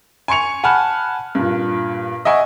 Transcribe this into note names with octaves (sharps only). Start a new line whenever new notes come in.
G#5 C6 C#6 C#7 F7
F#5 G#5 A5 B5 F6 F#6
G2 A#2
D#5 E5 F#5 G#5 C#6